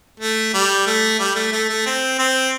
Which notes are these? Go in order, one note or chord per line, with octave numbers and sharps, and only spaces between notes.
A3
G3
A3
G3
A3
A3
A3
C4
C4